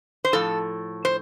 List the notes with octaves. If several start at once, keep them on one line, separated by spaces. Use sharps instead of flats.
C5
A2 F3 A4
C5